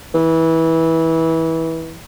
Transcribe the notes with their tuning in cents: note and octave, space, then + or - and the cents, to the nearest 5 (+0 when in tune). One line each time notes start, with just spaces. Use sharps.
E3 -20